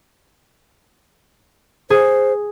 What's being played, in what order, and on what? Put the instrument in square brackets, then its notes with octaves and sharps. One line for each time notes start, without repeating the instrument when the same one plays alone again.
[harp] G#4 [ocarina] C5